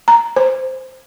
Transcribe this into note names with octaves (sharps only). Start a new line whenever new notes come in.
A#5
C5